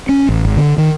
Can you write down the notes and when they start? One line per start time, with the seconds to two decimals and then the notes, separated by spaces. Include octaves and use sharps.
0.09 C#4
0.29 A1
0.45 G#1
0.57 D3
0.78 D#3